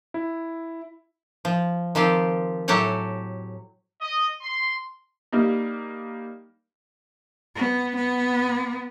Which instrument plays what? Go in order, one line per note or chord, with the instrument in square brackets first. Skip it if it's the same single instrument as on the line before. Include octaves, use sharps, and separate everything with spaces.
[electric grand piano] E4
[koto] F3
D#3 F3 C4 G4
A2 F#3 G4 A4 F#5 G#5
[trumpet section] D#5
C6
[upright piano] G3 A#3 D#4
[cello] B3
B3